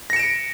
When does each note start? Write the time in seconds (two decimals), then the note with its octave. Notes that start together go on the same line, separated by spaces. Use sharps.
0.10 A#6
0.13 C#7
0.16 E7
0.19 D7